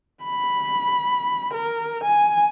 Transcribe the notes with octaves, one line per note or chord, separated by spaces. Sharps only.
B5
A#4
G#5